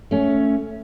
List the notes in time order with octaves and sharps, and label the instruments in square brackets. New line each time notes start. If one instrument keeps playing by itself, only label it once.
[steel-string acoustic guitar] A3 C#4